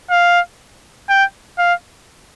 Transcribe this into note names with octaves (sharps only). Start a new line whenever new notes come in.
F5
G5
F5